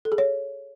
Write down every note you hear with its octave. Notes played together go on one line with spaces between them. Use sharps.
A4
G#4
C#5